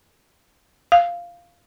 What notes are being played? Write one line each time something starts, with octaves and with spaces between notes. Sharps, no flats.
F5